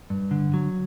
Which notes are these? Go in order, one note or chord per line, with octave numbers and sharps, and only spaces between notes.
G2
D3
F#3